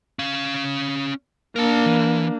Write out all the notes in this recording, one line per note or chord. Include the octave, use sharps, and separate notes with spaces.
C#4 F5
A#3 D4 A#4 A5
E3